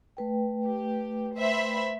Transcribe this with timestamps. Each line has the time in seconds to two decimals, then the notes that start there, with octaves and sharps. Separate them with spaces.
0.17 A3 B4 G5
0.65 G4
1.38 C5 E5 B5